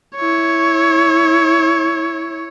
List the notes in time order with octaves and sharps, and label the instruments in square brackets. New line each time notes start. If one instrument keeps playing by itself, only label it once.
[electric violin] E4 C#5